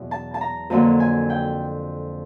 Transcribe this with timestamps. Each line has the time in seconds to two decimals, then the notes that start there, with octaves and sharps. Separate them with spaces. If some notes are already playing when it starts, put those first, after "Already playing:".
Already playing: E2 B2 F#3
0.11 A5
0.34 A5
0.41 A#5
0.70 F2 D3 F#3 A#3 A5
1.00 G#5
1.30 G5